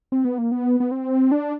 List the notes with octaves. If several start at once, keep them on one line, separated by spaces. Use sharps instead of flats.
C4
B3
A#3
B3
B3
C4
D4